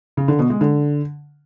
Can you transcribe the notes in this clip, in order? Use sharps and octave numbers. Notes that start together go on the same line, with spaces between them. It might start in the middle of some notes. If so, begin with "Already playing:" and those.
C#3
D3
B2
G#3
D3